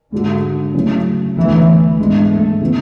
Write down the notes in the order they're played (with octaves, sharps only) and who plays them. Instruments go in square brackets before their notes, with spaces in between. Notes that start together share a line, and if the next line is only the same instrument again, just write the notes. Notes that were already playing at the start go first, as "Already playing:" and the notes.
[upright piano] G#2 G#3 D4 F#4 [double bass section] D3
[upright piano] C#3 F#3 A3 C#4 E4
[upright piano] D2 D3 G#3 B3 [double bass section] E3
[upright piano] G#2 E3 B3 D4 [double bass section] G#3
[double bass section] A3
[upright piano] C#3 E3 B3